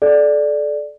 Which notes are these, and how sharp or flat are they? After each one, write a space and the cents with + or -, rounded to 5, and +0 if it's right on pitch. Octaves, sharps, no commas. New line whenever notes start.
A4 -30 D5 +5